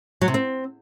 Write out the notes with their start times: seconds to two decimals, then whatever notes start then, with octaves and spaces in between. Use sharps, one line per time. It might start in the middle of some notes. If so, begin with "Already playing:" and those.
0.21 F#3
0.28 C3
0.34 C4